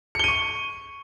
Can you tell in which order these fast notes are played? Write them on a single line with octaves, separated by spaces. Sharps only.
C#7 G7 D#7 C#6